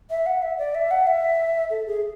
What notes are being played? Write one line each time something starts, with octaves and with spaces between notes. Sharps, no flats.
E5
F#5
E5
D5
E5
F#5
E5
A4
G#4